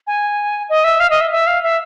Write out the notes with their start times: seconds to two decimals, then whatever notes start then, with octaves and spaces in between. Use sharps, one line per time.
0.07 G#5
0.69 D#5
0.84 E5
1.00 F5
1.10 D#5
1.21 E5
1.31 E5
1.47 F5
1.63 E5